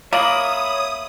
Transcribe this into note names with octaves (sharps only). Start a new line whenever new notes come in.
A#3 C#5 E5 B5 D#6